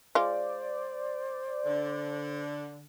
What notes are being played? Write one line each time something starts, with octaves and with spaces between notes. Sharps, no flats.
G#3 F4 C5 D5
D3